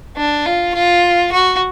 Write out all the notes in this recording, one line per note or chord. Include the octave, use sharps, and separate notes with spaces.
D4
F4
F4
F#4